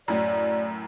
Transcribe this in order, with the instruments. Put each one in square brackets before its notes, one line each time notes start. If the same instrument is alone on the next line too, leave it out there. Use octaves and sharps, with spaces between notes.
[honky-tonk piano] F#2 A2 [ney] D5